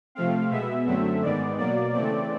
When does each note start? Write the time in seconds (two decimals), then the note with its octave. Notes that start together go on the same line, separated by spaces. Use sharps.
0.15 C3 F3 A3 C4 F5
0.51 B2 G#3 B3 E5
0.87 F#2 D3 F#3 A3 C4
1.22 G#2 D#3 G#3 B3 D5
1.58 B2 F#3 A#3 D5
1.94 C#3 E3 A3 C4 D5